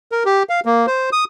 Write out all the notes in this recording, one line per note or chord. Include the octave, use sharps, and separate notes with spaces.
A#4
G4
F5
A#3
C5
D#6